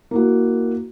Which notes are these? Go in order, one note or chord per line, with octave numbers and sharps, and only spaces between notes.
A#3 E4 F#4